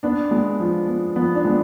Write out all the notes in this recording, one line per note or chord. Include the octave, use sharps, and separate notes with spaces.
B3 D4
G#3
F3
B3
F3 B3
D4
G#3